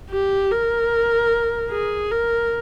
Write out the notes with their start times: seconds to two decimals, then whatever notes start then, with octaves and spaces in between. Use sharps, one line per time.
0.10 G4
0.51 A#4
1.70 G#4
2.11 A#4